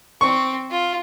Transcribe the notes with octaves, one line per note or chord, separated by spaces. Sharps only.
C4 C#6
F4